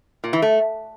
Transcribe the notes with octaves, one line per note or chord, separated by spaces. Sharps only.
A#2
E3
A3